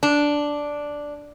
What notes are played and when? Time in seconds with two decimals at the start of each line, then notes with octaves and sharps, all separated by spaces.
0.03 D4